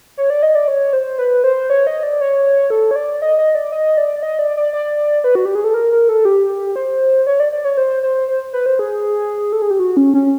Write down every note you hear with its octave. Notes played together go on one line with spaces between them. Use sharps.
C#5
D5
D#5
D5
C#5
C5
B4
C5
C#5
D#5
D5
C#5
A4
C#5
D5
D#5
D#5
D5
D#5
D5
D#5
D5
D5
D5
B4
F#4
G4
G#4
A4
A#4
A#4
A4
G4
C5
C#5
D5
D5
C#5
C5
C5
C5
B4
C5
G#4
A4
G#4
G4
F#4
C#4
C#4